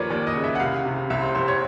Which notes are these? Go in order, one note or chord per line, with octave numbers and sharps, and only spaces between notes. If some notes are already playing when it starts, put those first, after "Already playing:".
Already playing: D#2 F3 A#4 B4 C#5 D5
D#2 D5
D#5
C#3
E5
F#5
C2 F5
C3
C2 E5
C5
C2 C5
C#5